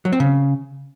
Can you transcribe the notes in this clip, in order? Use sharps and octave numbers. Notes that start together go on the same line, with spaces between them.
F#3
C4
C#3